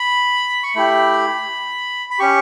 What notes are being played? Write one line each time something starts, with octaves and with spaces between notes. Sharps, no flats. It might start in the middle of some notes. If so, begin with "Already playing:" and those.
Already playing: B5
C#6
A3 E4 G4 B5
B5
C#4 G4 C#6